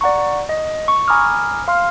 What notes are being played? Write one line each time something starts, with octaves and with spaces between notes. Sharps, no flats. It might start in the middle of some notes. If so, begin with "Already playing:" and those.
D5 F#5 A#5 C#6
D#5
C#6
G#5 A#5 B5 D6 D#6 F6
F5 C6 F6